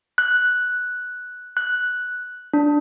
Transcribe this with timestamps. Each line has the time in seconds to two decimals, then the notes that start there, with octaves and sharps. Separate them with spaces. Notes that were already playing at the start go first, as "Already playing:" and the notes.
0.18 F#6
1.57 F#6
2.53 D4